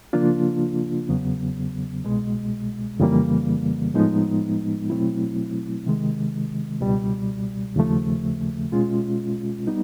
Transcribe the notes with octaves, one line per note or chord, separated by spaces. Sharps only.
C#3 F3 A#3 D4 F4
E2 C#3 F#3 B3
C2 B2 G#3
F2 C#3 E3 G3 A#3
A2 F3 G#3 B3 D#4
B2 F#3 A3 C4 E4
C3 D#3 G#3
C#2 B2 G3
D#2 C#3 F3 A3
B2 G#3 C#4 F4
G3 B3 D#4